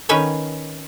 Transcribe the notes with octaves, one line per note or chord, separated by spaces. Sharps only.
D#3 C#4 B4 C#5 G5